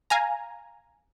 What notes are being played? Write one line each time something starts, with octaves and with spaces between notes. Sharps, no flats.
F5 G#5 A#5